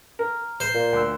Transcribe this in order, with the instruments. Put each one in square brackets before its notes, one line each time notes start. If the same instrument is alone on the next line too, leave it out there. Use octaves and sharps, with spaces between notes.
[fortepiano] A#4
[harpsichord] C5
[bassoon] A#2
[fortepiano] D2 E6